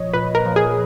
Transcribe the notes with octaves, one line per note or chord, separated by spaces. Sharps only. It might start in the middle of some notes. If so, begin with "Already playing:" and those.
Already playing: A#2 F3 C#5 D#5
A#2 B4
A#4
F3
G#4